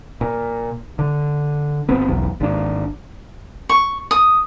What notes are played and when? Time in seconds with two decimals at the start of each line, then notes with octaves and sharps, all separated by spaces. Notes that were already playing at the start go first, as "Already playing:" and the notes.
0.21 A#2
0.99 D3
1.89 G#1 B3 C4
2.08 F#1 B1 E2
2.40 G#1 D4
3.69 C#6
4.11 D#6